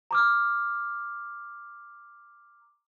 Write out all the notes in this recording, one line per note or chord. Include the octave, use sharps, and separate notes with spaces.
A#5 D6 F6